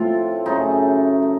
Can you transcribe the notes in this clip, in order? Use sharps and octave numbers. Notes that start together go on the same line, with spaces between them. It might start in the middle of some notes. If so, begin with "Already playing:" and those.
Already playing: A2 F3 C4 F4
F#2 C#3 A3 D#4
A3